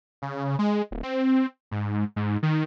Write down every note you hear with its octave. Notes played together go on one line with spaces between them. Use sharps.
C#3
G#3
D1
C4
G#2
G#2
D#3